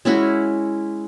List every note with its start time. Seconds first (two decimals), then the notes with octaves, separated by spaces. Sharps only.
0.05 G#3 C#4 E4 F#4